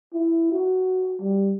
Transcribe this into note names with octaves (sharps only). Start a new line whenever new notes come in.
E4
F#4
G3